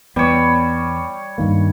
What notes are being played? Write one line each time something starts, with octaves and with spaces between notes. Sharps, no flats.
E2 G3 B3 C#5
G2 D#3 A#3